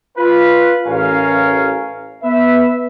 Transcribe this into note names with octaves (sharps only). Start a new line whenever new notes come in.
F4 B4
A1 C#4 A#4 F5
B3 B4 E5